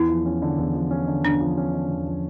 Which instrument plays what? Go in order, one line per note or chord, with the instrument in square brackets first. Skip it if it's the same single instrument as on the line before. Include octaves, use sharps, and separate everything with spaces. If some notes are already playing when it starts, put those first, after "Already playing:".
Already playing: [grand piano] E2 [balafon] E4
[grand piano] F3
C#4
D3
E2
F3
C#4
D3
[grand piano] E2 [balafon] D4
[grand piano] F3
C#4
D3
E2
F3